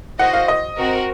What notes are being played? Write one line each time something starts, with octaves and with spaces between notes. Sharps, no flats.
F#4 C5 D#5 F#5
F5
D#5
C4 F#4 A#4